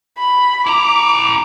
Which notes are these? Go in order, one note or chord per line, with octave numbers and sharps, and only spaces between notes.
B5
E4 A#5 D6